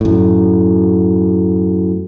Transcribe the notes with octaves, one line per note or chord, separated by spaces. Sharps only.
F#2 A2